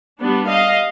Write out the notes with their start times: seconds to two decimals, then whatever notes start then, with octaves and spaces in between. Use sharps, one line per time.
0.21 G3 B3 D4
0.49 D#5 F5